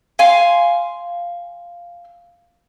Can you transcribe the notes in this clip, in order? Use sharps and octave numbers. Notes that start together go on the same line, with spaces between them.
F5 G#5 C6